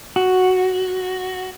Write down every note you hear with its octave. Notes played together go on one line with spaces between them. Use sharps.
F#4